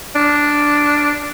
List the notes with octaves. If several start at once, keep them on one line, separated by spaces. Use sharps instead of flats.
D4